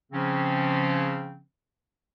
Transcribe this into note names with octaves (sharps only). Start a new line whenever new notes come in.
C#3 F3 C4 C#4